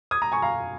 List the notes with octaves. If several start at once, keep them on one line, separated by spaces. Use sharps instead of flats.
D#6 G#6
A#5 D#6
G#5 C#6
F5 A#5